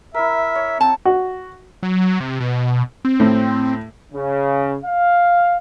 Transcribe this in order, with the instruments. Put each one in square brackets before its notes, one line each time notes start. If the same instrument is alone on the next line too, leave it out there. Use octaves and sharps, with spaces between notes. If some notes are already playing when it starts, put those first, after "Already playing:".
[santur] E4 A#4 [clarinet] E5
[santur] C#5
[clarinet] C4 [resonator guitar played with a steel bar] A5
[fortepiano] F#4
[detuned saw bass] F#3
C3
B2
C4
[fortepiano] A2
[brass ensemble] C#3
F5